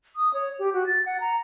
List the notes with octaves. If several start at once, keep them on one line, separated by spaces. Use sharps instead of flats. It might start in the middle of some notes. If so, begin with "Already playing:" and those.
D#6
C#5
G4
F#4
A6
F#5
A#5